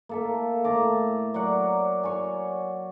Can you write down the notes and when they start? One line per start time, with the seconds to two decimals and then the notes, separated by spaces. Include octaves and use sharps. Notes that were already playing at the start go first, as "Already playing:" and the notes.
0.09 A#3 A4 E5
0.64 A2 A5 A#5 D6
1.34 F#3 A#4 D5 F#5
2.04 C#5 D5 G#5